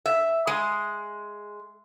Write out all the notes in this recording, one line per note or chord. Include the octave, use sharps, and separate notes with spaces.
E5
G#3